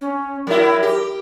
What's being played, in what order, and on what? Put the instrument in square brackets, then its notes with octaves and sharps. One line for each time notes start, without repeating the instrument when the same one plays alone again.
[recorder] C#4
[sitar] F#3 E4 [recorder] A#4
[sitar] G4